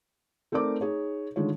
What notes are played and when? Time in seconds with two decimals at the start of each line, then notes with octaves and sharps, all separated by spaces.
0.52 A3 C4 D#4 A#4 D5 D6
0.81 D#4 G#4 C#5
1.36 D3 D#3 G#3 F4 C#5